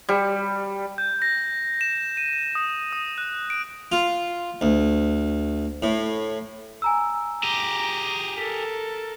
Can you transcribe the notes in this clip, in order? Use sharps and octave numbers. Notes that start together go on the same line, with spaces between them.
G3
G6
A#6
E7
D#7
D#6
D#6
F#6
D7
F4
D2
A2
G#5 A#5 E6
G4 G#4 A#5 D6 F7
A4 A#4 B6